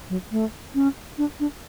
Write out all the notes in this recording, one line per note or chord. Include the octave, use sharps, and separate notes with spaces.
F#3
A3
C#4
D4
D4